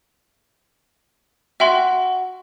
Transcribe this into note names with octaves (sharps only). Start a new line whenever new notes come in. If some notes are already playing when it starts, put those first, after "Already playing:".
F#4 E5 G5 C6